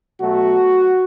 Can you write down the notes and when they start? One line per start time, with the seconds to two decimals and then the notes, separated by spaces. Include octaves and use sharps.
0.20 B2 F#3 A3 F#4